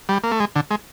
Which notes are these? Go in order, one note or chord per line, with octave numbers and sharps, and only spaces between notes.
G3
A#3
A3
G#3
D3
G#3